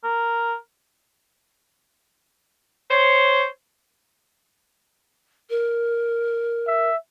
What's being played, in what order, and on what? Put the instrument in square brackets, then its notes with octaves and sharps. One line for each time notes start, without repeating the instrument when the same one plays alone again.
[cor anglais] A#4
[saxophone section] C5 C#5
[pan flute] A#4
[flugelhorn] E5